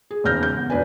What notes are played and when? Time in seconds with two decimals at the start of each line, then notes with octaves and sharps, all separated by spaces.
0.11 G#4
0.24 E1 D#2 C#3 F6 G6 A#6
0.43 G6
0.57 B3
0.70 E1 D4 B4 G#5